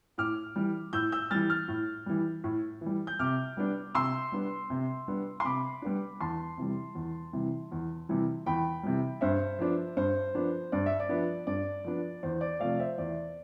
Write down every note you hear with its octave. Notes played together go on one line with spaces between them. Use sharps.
A2 D6 F6
E3 G3
A2 E6 G6
E6 G6
E3 G3 F6 A6
F6 A6
A2
E3 G3
A2
E3 G3
G6
C3 D6 F6
G3 B3 D4
C3 C6 E6
G3 B3 D4
C3
G3 B3 D4
C6
C3 B5 D6
G3 B3 D4
E2 A5 C6
C3 E3 G3
E2
C3 E3 G3
E2
C3 E3 G3
E2 G5 B5
C3 E3 G3
G2 C5 E5
F3 B3 D4
G2 C5
F3 B3 D4
G2 D5
E5
D5
F3 B3 D4
G2 D5
F3 B3 D4
E2 C5
D5
C3 F3 A3 D5 F5
C5 E5
E2 D5